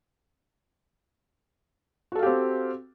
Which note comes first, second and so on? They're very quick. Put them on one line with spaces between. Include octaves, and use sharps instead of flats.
F#4 A4 F5 G4 C4